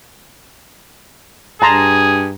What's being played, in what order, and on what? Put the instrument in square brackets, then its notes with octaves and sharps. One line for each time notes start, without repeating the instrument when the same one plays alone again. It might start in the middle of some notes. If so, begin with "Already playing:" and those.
[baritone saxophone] G2 [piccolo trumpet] G#4 [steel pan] A5 A#5 C6